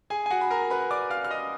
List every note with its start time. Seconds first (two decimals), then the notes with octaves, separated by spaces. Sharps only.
0.10 G#4 G#5
0.26 G#5
0.30 F#4 F#5
0.41 B5
0.50 A#4 A#5
0.70 B4 B5
0.91 D5 D6
1.10 F5 F6
1.25 F6
1.31 D#5 D#6